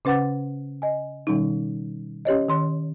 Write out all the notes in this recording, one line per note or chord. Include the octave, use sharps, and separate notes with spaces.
C#3 C#4 B4 F#5 D6 A6
D#5 G#5
B2 D#3 G3 C#4 D#4
C#4 G4 C#5 D#5
D#3 C6